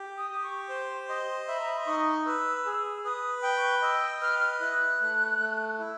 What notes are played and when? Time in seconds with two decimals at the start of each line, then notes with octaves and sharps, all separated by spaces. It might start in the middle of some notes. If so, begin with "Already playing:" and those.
Already playing: G4
0.18 D#6
0.31 G4
0.43 C#6
0.69 C5 C6
1.09 D#5 C6
1.48 E5 B5
1.59 A#5
1.68 B5
1.78 C6
1.87 D#4 C#6
2.26 B4 E6
2.66 G#4
3.04 B4 D#6
3.43 G5
3.57 C#6
3.82 D#5 E6
4.21 B4 F6
4.60 E4 F#6
5.01 A3
5.39 A3
5.79 E4